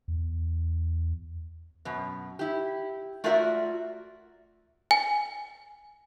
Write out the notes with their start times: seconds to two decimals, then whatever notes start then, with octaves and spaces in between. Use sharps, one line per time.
0.08 E2
1.85 F#2 B2
2.39 E4 G4
3.24 A3 F4 F#4 A#4 D5 E5
4.91 G#5